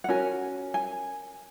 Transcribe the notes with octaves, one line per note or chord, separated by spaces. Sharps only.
F#5
C#4 F#4 A#4 G#5
G#5